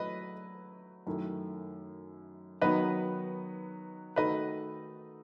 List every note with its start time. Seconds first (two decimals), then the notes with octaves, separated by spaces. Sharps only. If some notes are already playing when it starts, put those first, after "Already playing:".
Already playing: F#3 A3 E4 B4 D#5
1.07 F#2 D#3 A3 E4
2.61 D#3 F#3 B3 D#4 B4 D#5
4.16 D#3 A3 D#4 F#4 A4 B4 D#5